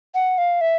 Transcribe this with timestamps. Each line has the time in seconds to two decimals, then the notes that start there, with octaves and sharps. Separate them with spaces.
0.15 F#5
0.38 F5
0.61 E5